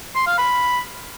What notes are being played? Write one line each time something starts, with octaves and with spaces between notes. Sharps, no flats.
C6
F5
B5